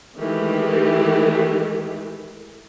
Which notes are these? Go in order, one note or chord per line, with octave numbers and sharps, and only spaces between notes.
D#3 E3 G#3 A3 G4